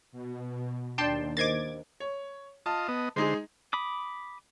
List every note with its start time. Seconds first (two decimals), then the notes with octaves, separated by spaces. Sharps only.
0.12 B2
0.98 D#2 D4 D5 G5 A5 C6
1.37 A#4 C5 D#5 D6 G#6 A6
2.00 C#5
2.66 F4 D#5 A5
2.88 B3 D#5
3.16 D3 G#3 D#4 G#4 C5
3.73 B5 D6 D#6